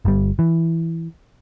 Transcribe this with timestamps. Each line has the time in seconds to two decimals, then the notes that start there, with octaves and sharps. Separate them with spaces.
0.05 G1 G3
0.39 E3